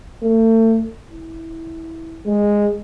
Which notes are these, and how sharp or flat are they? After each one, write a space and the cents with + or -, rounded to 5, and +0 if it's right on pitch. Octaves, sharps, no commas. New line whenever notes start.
A3 +35
E4 -15
G#3 -10